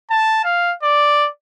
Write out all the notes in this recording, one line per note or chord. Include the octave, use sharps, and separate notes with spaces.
A5
F5
D5